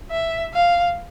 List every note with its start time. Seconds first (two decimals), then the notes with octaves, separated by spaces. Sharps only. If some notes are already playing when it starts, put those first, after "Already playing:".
0.11 E5
0.54 F5